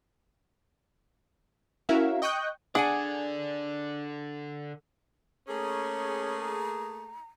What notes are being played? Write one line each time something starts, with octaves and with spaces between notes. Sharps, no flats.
C#4 E4 F#4 A#4 E5 F5
D#5 G5 C#6 D#6 F#6 G6
D3 D4 G#4 D5 F#5 G#5
A3 A#3 C#4 G#4 A#5